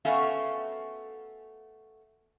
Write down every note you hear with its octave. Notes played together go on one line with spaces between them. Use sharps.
A3 B3 C#4 F#4 E5 F5